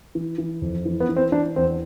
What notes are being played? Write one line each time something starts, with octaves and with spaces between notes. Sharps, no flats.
E3
E3
F2
E3
B3
E3
C4
E3 D4
E2 C4